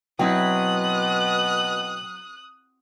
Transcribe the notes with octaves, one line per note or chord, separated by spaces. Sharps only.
B2 F#3 C4 E4 G5 D#6 F#6